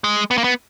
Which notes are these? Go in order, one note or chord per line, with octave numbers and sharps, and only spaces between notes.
G#3
B3
A#3
B3